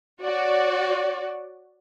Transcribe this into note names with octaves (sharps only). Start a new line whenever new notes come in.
F#4 C#5 D5